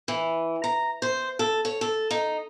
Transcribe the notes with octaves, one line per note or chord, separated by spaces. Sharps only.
E3
A#5
C5
A4
C#5
A4
D#4